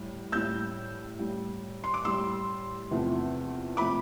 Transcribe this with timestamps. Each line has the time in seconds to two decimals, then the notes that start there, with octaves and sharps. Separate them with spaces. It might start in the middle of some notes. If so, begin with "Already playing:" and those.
Already playing: A2 G3
0.32 A2 G3 E6 G6
1.19 A2 G3
1.84 C6
1.94 D6
2.05 A2 G3 C6 E6
2.91 E2 C3 F3 A3
3.77 C3 F3 A3 B5 D6